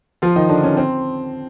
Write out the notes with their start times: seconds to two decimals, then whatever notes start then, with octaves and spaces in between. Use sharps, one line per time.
0.22 F3 F4
0.36 D#3 D#4
0.49 D3 D4
0.64 C#4
0.77 C4